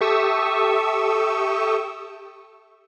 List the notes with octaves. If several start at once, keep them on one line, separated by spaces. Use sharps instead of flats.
G4 A4 E5 C#6 D#6 E6